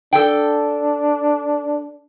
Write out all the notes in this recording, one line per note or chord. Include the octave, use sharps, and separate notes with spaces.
D4 A4 G5